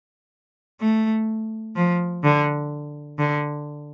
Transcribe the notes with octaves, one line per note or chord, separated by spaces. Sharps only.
A3
F3
D3
D3